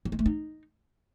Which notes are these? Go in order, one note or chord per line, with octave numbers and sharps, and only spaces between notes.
F#3
G#3
A3
D#4